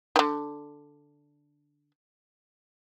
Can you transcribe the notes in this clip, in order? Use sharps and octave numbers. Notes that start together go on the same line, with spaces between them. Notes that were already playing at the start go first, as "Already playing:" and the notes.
D3 D#3